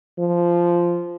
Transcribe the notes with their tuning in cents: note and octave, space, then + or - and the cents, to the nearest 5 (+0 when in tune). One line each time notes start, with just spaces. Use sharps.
F3 -10